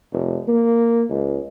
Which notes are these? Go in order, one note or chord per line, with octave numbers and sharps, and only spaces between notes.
F1
A#3
C#2